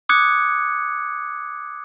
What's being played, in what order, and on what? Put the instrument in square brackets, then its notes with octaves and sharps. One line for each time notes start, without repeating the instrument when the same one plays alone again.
[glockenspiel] D6 D#6 F#6 G#6 C#7